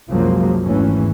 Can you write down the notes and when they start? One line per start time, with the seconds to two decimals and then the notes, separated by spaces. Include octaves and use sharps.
0.10 C2 F#2 F3 F#3 G#3 A#3
0.64 G#1 E2 G#2 E3 A3 C#4